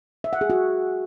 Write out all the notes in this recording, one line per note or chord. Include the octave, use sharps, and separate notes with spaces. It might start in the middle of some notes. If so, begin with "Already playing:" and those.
E5
F#5
G#4
F#4